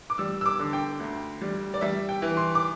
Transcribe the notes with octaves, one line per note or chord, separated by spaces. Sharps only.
D6
G3 E6
E6
D6
D3
G5
D2
G3
D5
G3 E5
G5
E3
C6
D6